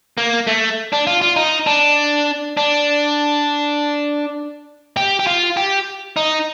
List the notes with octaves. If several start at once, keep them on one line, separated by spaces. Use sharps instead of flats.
A#3
A3
D4
F4
F4
D#4
D4
D4
G4
G4
F4
G4
D#4